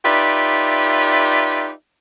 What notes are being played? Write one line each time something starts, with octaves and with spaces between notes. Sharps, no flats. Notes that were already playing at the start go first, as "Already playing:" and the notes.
D#4 F4 G4 B4 D5 E5